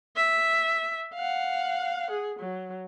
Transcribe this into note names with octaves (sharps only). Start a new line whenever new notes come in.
E5
F5 F#5
G#4
F#3